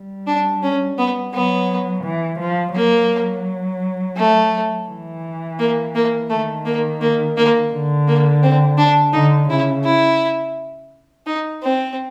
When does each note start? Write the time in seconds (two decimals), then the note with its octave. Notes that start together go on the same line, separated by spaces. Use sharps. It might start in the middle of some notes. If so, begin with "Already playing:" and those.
Already playing: G3
0.27 D4
0.63 C#4
0.98 B3
1.34 F#3 B3
2.04 E3
2.40 F3
2.76 F#3 A#3
4.17 A3
4.89 E3
5.59 A#3
5.95 A#3
6.30 D#3 A3
6.66 A#3
7.01 A#3
7.37 A#3
7.72 D3
8.08 A#3
8.43 C4
8.78 D4
9.13 D3 D#4
9.50 C#3 E4
9.85 E4
11.27 D#4
11.63 C4